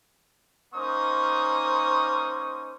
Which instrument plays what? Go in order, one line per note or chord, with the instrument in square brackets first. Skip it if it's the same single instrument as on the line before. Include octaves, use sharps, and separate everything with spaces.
[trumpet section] A#3 C#4 D#4 C5 C#6 D#6